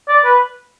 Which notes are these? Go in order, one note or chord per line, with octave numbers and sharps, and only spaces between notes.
D5
B4